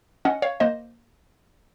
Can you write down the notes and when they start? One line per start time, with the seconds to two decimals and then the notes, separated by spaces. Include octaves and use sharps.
0.25 C#4 D#5 F#5
0.42 C#5 F5
0.60 A#3 C5 D#5